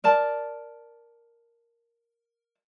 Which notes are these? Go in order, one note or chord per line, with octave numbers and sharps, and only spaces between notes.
A#4 D5 A5